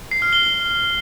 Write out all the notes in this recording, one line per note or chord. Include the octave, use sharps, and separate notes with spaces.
C7
F6
G7
G7